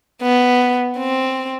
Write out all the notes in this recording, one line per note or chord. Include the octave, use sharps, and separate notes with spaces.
B3
C4